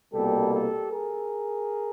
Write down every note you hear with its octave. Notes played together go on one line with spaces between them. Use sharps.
C2 B2 G3 A#3 G4 A4
G4 A4
G#4 A#4